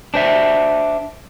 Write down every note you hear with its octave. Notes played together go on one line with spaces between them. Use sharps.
D4 C5 E5